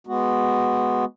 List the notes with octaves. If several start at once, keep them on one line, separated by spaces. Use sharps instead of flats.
G#3 B3 F#4